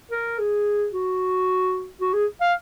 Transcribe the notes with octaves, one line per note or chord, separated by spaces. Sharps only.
A#4
G#4
F#4
F#4
G#4
F5